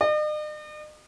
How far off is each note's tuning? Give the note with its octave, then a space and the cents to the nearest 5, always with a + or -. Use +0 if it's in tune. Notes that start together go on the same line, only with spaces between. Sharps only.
D#5 -45